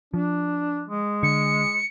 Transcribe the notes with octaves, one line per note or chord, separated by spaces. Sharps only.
F3 D4
G#3
D3 C#7